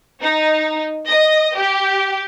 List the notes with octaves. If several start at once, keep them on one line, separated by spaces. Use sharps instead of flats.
D#4
D#5
G4